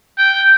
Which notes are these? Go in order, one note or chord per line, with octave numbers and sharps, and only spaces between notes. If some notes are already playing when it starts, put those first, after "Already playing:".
G5